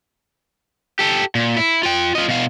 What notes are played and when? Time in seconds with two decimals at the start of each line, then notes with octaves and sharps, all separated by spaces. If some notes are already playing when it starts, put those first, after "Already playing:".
0.99 G4 A4
1.35 A#2
1.56 E4
1.83 F4 G5
2.15 F4 D#5
2.28 B2 F5